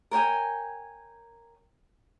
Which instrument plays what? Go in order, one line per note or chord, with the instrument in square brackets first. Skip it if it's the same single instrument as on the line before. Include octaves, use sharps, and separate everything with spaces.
[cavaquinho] A#4 C#5 G5 G#5